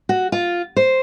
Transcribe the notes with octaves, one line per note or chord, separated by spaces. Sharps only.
F#4
F4
C5